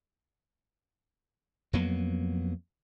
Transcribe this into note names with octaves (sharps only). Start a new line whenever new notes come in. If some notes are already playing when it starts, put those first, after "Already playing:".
F2 F#3 A#3 B3